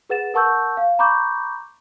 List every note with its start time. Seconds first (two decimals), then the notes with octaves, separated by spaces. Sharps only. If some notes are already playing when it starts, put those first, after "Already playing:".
0.10 G#4 B4 F#5 A6 E7
0.34 A#4 F#5 A5 C#6 E6 G6
0.77 F5
0.99 A#5 B5 C#6 D6 G6